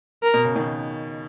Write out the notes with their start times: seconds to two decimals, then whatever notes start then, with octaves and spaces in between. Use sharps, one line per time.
0.23 A#4
0.34 B2
0.44 C#3
0.55 B2 D#3